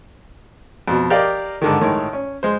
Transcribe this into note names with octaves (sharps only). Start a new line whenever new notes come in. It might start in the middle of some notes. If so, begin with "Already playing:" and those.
F2 B2
G4 A#4 D5 D#5 F5
G#2 D3 D#3
A2 D#3 G#3
C#4
G#3 C5